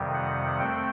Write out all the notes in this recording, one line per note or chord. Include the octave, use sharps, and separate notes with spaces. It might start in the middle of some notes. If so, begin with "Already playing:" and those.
Already playing: F2 C3 D#3 G3
F#5
A3 C4 G5